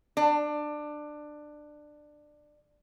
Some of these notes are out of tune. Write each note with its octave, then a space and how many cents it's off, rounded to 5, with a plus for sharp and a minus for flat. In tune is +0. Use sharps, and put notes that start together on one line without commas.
D4 +20